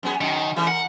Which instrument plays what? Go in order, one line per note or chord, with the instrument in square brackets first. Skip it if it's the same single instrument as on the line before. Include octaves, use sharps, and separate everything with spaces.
[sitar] F#2 B3 G#4
[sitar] F#2 [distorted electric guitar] D#3
[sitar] C#3 E3 A3
[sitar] A#4 [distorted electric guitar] F#5